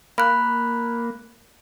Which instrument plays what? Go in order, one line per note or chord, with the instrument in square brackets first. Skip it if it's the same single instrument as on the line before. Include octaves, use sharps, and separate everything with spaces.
[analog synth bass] A#3 [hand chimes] B5 F#6